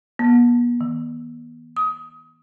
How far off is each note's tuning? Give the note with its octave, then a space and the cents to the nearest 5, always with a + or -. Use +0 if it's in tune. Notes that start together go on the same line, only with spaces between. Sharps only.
B3 -40
D#3 +45
D#6 +25